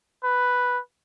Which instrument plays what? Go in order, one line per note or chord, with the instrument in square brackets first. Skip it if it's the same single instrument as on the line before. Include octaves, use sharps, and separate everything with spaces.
[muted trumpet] B4